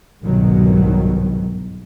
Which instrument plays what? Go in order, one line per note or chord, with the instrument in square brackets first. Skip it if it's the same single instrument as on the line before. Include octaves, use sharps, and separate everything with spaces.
[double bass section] G1 C2 G#2 B2 D#3 F#3